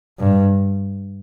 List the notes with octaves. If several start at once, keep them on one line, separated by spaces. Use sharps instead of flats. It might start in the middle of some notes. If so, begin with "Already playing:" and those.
G2